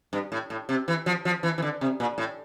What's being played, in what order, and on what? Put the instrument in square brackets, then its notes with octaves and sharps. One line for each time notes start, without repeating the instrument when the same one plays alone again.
[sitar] G2
A2
A2
C3
E3
F3
F3
E3
E3
D3
C3
A#2
A2